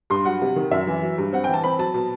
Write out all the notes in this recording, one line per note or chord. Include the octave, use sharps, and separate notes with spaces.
G2 C6
F#3 F#5
C3
D#3
F#2 E5
E3
F#3
G2
C4 F#5
G5
E3 A5
C4 B5
F#3 A5
B2